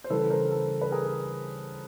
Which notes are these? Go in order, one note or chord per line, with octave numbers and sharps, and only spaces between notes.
C5
C#3 E3 G3 A4 B4
A#4 C5
A4
B4
G#4 A#4